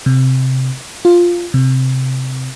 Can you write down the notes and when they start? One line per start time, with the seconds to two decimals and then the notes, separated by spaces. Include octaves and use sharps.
0.06 C3
1.05 F4
1.54 C3